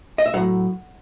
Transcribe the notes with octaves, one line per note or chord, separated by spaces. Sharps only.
D#5
E5
A2 F#3 F#5